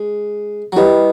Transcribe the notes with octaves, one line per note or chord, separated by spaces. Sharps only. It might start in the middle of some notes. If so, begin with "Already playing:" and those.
Already playing: G#3
F#3
G3 E4 G4 B4 D#5